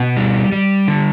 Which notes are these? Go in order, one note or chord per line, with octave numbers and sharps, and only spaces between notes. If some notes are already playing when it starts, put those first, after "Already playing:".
Already playing: B2
G3
G3
D3